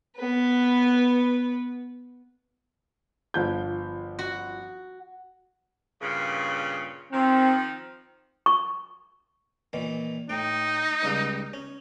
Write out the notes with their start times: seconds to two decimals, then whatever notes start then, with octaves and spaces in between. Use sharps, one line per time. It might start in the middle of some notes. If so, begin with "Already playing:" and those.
0.17 B3 B4
3.34 G1 F3 G6
4.19 F#4
6.02 G2 A#2 C#3
7.13 D#3 F3 C4
8.46 C#6
9.73 A#2 D#3 E3
10.29 A2 D#4 G5
11.03 C#2 G3 F5
11.53 C#4